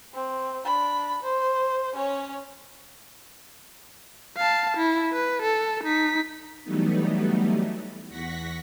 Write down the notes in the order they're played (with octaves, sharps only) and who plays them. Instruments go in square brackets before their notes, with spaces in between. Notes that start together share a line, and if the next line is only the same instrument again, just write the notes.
[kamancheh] C4
D4 B5
C5
C#4 C#5
[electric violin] F5 A5
E4
B4
A4
D#4 B6
[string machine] E3 F#3 G3 A3 B3 D#4
E2 F#5 C#6 A#6 B6